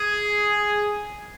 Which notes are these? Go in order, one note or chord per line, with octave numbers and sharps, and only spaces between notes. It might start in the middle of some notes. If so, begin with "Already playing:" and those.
Already playing: G#4